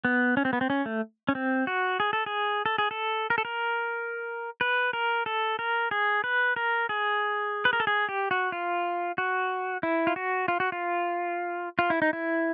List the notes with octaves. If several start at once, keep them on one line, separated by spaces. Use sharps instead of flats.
B3
C#4
C4
B3
C4
C#4
A3
C#4
C4
F#4
G#4
A4
G#4
A4
G#4
A4
A#4
A4
A#4
B4
A#4
A4
A#4
G#4
B4
A#4
G#4
B4
A#4
A4
G#4
G4
F#4
F4
F#4
E4
F4
F#4
F4
F#4
F4
F4
E4
D#4
E4